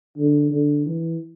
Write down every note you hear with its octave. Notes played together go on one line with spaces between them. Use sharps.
D3
D3
E3